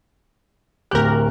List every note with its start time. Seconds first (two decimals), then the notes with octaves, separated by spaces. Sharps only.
0.91 D1 D2 G4 A#4 F#6